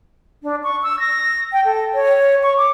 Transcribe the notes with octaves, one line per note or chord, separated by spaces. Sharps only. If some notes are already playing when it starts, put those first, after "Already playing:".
D4
C#6
E6
A#6
G5
A4
C#5
C#6
D6